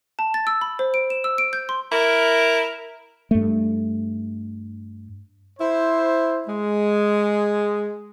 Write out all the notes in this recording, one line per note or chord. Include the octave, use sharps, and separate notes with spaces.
A5
A6
E6
B5
C5
D7
E7
E6
D7
G6
C6
E4 A#4
G2 A3
E4 C5
G#3